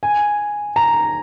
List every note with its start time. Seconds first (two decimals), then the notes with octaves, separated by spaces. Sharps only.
0.03 G#5
0.76 A#5